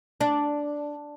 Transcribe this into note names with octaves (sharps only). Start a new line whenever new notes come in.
D4